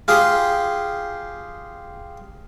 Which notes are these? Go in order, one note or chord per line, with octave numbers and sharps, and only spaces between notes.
F4 G4 G#4 G5